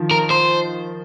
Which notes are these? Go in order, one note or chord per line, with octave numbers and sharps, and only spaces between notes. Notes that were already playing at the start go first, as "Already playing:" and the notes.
Already playing: D#3 F3
A#4
C5